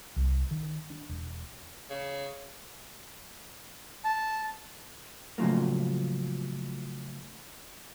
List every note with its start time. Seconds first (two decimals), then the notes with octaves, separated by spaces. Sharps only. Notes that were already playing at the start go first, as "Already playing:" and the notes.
0.16 C2
0.51 D#3
0.90 D4
1.09 E1
1.90 C#3
4.04 A5
5.38 A2 C#3 F3 F#3 A#3